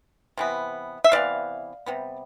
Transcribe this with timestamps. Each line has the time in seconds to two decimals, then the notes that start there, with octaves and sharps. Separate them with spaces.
0.37 C3 E3 B3
1.04 E5
1.12 C3 E3 B3 D5 F5
1.86 C3 G3 B3